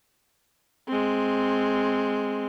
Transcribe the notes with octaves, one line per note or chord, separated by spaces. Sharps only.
G#3 C4